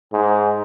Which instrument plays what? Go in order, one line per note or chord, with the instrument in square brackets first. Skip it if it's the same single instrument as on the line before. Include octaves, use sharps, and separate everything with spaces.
[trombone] G#2